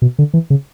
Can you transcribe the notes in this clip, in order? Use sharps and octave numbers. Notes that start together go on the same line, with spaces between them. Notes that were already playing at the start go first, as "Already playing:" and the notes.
B2
D3
E3
C#3